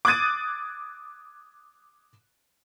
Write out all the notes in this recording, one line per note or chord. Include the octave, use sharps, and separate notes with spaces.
D6 D#6 F#6 G#6 A6 D#7